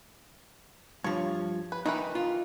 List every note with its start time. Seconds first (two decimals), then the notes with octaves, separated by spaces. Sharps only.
1.04 G2 F3 C#5
1.72 B4
1.86 D#3 E3 D#4 B4
2.15 F4